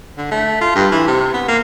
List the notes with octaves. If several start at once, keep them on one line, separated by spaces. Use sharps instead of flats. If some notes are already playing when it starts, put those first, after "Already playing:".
D3
A3
F4
G2
E3
C3
B3
A#3